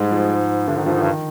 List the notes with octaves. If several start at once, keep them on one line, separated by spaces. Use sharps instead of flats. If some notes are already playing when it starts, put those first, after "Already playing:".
Already playing: G#2 G3 G#3
F3
G2 D3
G#2 D#3
G2 F3
G#2 D#3
G2
D#3